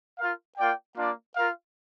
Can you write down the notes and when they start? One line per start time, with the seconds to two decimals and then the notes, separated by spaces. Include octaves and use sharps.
0.19 F4 A#4 F5
0.58 A#3 F4 D5 G5
0.97 A#3 D4 F4 D5
1.36 F4 A#4 F5